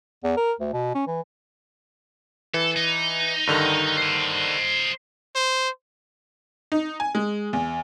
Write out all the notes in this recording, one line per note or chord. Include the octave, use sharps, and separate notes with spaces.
E2
A#4
D2
B2
C#4
E3
E3 A4
D#4
G2 D3 D#3
C5 D#5
C5
D#4
G#5
G#3
E2